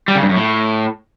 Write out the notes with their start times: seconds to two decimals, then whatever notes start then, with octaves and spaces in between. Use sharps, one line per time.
0.08 G3
0.15 C#3
0.22 G2
0.29 F#2
0.36 A2